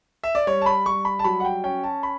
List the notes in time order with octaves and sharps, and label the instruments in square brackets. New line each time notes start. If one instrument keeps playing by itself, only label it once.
[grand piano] E5
D5
G3 C#5
A5
B5
G3 C#6
B5
A5
F#3 B5
F#5
G5
C#4 G5
A5
B5